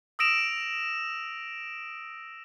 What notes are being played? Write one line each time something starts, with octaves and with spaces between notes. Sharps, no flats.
D#6 E6 A#6 D7 E7 F7